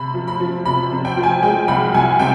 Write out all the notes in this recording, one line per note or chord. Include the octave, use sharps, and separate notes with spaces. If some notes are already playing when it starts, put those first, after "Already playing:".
Already playing: C3 B5
F3
B5
F3
C3 B5
C3
G5
F3
G#5
G#3 G5
C2 B5
C2 G#5
C3 G5